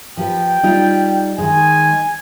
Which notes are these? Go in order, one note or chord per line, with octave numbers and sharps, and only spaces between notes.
F3 G4 B4 G5
G3 D#4 F4
D#3 G#3 G#5